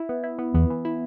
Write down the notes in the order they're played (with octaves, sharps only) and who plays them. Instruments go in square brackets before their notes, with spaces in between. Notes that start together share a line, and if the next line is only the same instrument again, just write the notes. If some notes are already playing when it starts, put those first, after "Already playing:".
Already playing: [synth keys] E4
B3
E4
B3
[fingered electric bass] E2 [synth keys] B3
[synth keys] E3
E4